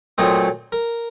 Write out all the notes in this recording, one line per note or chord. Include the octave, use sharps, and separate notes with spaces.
A#2 F#3 A3 C4 D#5
A#4